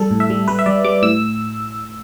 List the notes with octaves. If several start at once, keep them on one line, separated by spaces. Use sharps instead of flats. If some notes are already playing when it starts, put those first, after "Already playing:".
Already playing: G3 A4
A2
E5
G3
G3 B4
E5
G3 D5
G3 D6
A2 E6